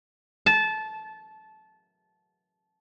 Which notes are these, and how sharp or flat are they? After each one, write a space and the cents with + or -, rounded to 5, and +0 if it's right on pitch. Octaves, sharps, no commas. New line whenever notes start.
A5 -20